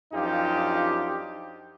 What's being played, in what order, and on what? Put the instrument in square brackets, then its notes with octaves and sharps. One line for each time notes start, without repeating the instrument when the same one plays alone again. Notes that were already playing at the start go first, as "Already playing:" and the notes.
[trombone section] F#2 F3 D4 D#4 F4 G4